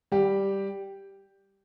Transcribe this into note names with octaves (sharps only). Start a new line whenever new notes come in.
G3 G4